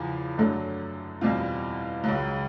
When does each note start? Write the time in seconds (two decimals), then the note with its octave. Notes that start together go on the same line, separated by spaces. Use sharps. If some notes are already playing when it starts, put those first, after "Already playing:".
Already playing: E2 C#3 F3
0.37 F#2 D3 F#3 A3 D4
1.21 E2 B2 G3 C4 F4
2.04 C#2 C#3 F#3